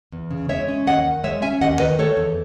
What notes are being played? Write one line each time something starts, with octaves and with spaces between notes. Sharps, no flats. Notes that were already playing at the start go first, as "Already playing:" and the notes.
E2
C#3
G#3 C#5 E5
C#4
D#2 D#5 F#5
D#3
G#3 C#5 E5
C#4 E5 G#5
D#2 D#5 F#5
D#3 B4 D#5
A3 A4 C#5
E2